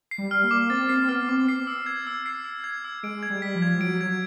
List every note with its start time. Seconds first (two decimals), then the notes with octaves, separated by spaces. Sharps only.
0.11 C7
0.18 G3
0.31 F6
0.44 A#3
0.51 D6
0.70 C4 A6
0.89 C4 C7
1.09 B3 F6
1.28 C4 D6
1.48 C7
1.67 E6
1.86 G#6
2.07 E6
2.26 C7
2.45 E6
2.64 G#6
2.84 E6
3.03 G#3 D7
3.23 G#6
3.30 G3
3.42 B6
3.55 F3
3.62 G#6
3.75 G3
3.81 F#3 D7
4.01 F#3 G#6